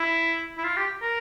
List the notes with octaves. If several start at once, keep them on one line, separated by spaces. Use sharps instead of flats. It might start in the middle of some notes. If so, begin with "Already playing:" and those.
Already playing: E4
E4
F4
G4
A#4